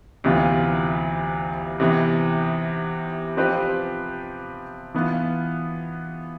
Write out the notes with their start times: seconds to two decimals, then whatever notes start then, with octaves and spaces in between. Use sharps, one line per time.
0.24 D2 C3 E3 B3 F4
1.80 C3 E3 B3
3.37 F3 C4 G4 B4
4.94 E3 B3 F4